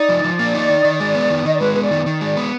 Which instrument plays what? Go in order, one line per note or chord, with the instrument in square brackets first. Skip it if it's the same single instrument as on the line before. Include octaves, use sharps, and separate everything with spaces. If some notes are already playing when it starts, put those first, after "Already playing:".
Already playing: [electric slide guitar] D#4 [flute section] D5
[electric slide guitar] F3
F3
A#3
D#4
D#3
D#3
G#3
B3
D#3
[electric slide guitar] D#3 [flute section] D#5
[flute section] D5
[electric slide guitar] G#3 [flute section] B4
[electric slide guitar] B3 [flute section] B4
[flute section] D5
[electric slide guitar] D#3
D#3
G#3
B3